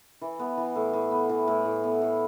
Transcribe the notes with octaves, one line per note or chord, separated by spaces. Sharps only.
E3
B3
E3
A2
A2
B3
E3
A2
A2
B3
A2